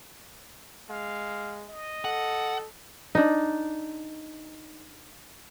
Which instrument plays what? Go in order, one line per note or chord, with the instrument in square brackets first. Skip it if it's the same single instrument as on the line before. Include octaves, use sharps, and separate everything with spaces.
[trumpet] G#3 [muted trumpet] F5
[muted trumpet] D#5
[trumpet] A4 [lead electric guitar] F#5
[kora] D4 D#4